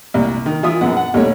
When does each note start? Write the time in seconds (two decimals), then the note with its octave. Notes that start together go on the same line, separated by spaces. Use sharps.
0.14 C2 A#2
0.46 D#3
0.63 E3 F4 E5 D#6
0.81 A#1 F#2 B3 F#5
0.97 F#5
1.14 D#2 B2 G3 A3 C#5